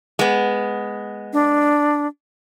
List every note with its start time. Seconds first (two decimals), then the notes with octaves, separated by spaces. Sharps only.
0.19 G#3 B3
1.33 D4